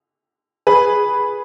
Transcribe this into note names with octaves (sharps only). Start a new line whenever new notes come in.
G#4 B4